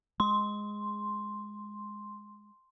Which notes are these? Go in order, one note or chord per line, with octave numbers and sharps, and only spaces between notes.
G#3 C6